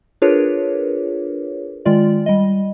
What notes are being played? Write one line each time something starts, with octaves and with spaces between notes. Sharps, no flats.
D4 F4 G#4 A#4 B4 C#5
D#3 G#3 F4 D5
G3 D#5